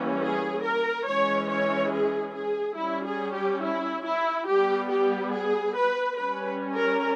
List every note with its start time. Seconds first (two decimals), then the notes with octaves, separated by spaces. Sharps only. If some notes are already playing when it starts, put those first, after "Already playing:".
Already playing: E3 G3 A#3 C#4
0.22 G#4
0.64 A#4
1.07 E3 G#3 C#4 C#5
1.50 C#5
1.92 G#4
2.35 G#4
2.77 G3 C#4 E4
3.06 G#4
3.34 G4
3.63 E4
4.05 E4
4.48 G3 B3 G4
4.91 G4
5.33 G#4
5.76 B4
6.18 G3 C#4 B4
6.76 A#4